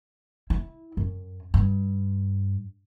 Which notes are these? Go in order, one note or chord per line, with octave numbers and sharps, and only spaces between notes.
E4
F#2
G2